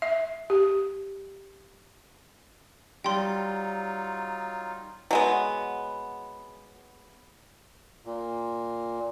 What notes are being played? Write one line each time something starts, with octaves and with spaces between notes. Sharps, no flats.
E5
G4
F#3 G3 D#4 F4 G5 C6
F#3 G#3 B3
A#2